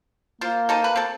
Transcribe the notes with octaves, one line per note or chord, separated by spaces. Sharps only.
A#3 F4 C5
D#4 A4 C5
B4
C4 A4